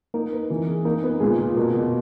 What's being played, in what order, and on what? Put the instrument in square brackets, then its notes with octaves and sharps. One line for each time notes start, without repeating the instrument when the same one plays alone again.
[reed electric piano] A#3 A#4 [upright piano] D#4
[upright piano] B4
E3
G#4
[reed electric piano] A#3 A#4 [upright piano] D#4
[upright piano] B3
[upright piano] A#2 [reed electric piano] G#3 G#4
[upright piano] A#2
[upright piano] B2 [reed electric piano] A#3 A#4
[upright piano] B2